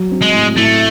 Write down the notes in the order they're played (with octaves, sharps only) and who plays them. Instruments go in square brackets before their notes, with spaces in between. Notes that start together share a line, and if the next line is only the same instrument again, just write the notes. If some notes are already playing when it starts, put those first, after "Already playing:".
Already playing: [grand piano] F#3
C4
[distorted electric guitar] G#3
[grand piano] A2
[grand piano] A2 [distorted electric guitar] A3